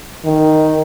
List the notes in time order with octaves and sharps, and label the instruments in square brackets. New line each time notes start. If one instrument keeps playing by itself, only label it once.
[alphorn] D#3